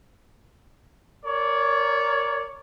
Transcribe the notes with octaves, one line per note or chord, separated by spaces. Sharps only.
A#4 C#5 D5